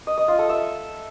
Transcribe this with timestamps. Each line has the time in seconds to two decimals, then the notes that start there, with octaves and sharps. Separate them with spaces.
0.07 D#5
0.18 D#5
0.28 F4
0.39 A4
0.49 E5